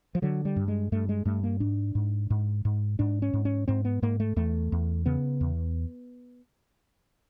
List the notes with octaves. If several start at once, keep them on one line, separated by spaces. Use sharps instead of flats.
F3
D3 F#3
G3
G2
G#3
G2 A3
G#3
G2 A3
A#3
G#2 D4
G#2
G#2
G#2
G#2 D4
C#4
G#2
C#4
G#2 C4
B3
G#2 A#3
A3
E2 A3
E2
C#3 B3
E2